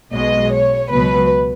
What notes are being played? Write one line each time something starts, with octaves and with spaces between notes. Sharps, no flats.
B1 B2 G#3 D#5
C#5
C#2 B2 F#3 B4